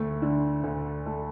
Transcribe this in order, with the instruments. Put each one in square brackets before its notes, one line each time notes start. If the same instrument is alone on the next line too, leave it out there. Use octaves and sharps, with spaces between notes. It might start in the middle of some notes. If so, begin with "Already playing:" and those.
Already playing: [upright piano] D2 [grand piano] A3
[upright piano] D3
D2
A3